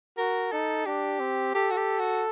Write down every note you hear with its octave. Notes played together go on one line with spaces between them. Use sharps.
F#4 A#4
D#4 A4
D4 G4
C4
G4 A4
F#4
G4
F#4